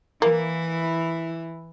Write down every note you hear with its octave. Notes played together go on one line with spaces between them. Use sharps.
E3 A#3 E4